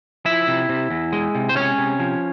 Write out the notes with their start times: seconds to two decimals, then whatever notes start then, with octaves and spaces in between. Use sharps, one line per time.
0.25 F3 E4 E5
0.47 C3
0.69 C3
0.90 E2
1.13 G#3
1.35 C3
1.49 C5
1.56 G#3 C#4 C#5
1.78 C3
2.00 F3